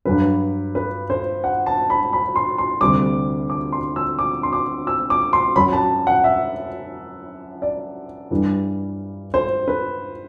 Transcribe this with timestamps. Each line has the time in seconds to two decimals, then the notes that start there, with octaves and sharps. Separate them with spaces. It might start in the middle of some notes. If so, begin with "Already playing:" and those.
0.05 G2 F#3 B4
0.75 B4
1.10 C5
1.44 F#5
1.66 A5
1.90 B5
2.13 B5
2.36 C6
2.58 C6
2.81 D2 C3 G3 D6
3.50 D6
3.72 C6
3.96 E6
4.19 D6
4.43 C6
4.53 D6
4.87 E6
5.10 D6
5.33 C6
5.56 F#2 F#3 B5
5.73 A5
6.07 F#5
6.24 E5
7.62 D5
8.31 G2 E3 G3
9.34 C5
9.68 B4